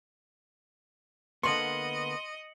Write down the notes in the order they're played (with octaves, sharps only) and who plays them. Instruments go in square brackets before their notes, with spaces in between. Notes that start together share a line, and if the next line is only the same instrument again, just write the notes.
[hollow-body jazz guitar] D3 A#3 B3 [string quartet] D#5 [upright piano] C6 [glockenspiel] C#7 F#7